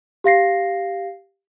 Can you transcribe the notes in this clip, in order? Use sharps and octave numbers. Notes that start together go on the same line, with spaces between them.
G4 F5 A#6 C7